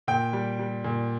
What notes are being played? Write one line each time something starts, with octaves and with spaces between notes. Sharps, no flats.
A#2 G5
G3
G3
A#2